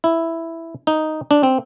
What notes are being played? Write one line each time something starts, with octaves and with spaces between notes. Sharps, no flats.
E4
D#4
D4
C4